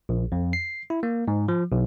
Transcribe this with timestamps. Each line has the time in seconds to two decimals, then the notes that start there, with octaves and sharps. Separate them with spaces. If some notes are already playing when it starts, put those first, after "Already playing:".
0.09 A#1
0.32 F2
0.53 C7
0.90 E4
1.03 A#3
1.28 G#2
1.48 F3
1.72 B1